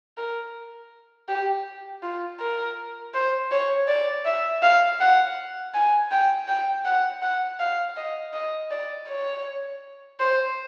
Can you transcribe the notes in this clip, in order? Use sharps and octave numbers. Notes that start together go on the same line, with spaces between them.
A#4
G4
F4
A#4
C5
C#5
D5
E5
F5
F#5
G#5
G5
G5
F#5
F#5
F5
D#5
D#5
D5
C#5
C5